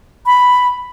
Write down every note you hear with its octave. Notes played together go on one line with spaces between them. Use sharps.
B5